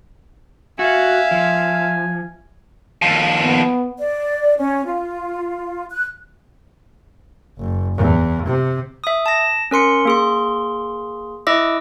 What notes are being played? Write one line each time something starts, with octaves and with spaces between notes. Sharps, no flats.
F#4 E5 F5 G#5
F3
D#2 F3
B3
D5
C#4
F4
F#6
F#1
E2
C3
E5 D#6
A5 A#6
C#4 A#4 C6 C#7
A#3 G#4 C6
E4 D#5 E5 D6 E6